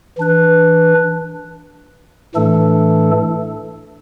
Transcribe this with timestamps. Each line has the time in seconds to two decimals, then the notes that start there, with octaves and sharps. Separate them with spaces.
0.18 E3 D4 B4
2.35 A2 E3 A3 D4 A4